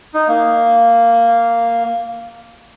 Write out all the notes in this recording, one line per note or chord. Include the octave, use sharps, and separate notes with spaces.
D#4
A#3